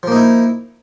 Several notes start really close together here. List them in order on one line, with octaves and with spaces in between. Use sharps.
F3 A#3 D#4 E4